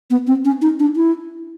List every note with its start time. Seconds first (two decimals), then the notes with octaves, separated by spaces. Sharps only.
0.10 B3
0.27 C4
0.45 C#4
0.62 D#4
0.79 D4
0.96 E4